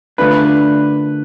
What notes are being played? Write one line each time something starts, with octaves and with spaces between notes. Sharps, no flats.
D3 A3 D4 F4 B4